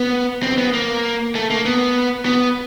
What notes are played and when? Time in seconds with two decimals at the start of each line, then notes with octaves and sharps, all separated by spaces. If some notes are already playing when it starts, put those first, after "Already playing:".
Already playing: B3
0.43 C4
0.58 B3
0.73 A#3
1.35 A3
1.50 A#3
1.65 B3
2.26 B3